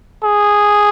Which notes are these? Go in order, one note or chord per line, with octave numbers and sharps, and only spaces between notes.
G#4